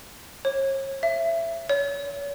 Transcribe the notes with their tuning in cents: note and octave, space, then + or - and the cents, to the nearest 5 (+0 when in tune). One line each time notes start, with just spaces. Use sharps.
C#5 -40
E5 +15
C#5 +30